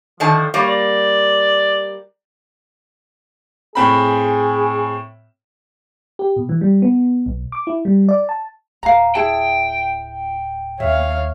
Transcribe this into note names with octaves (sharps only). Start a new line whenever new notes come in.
D3 D#3 F3 A5
G3 A#3 C#5
D5
A2 C4 G#4 B5
G4
B2
E3
G3
B3
B1
D6
E4
G3
D5
A5
D1 F5 A#5
E4 G#4 G5 A5
D#2 C#5 E5 F5